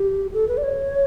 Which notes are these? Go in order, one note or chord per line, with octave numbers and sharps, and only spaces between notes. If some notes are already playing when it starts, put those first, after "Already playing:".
Already playing: G4
A4
B4
D5
C#5